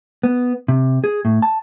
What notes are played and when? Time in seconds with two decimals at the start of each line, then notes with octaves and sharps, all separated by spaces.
0.23 B3
0.68 C3
1.04 G#4
1.25 A2
1.42 A5